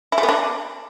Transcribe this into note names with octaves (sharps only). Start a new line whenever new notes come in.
E4
A3
B3
D4